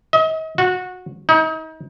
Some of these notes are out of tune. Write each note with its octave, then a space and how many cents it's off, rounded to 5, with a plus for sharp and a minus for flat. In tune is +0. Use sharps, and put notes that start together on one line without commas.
D#5 +40
F#4 -20
D#4 +35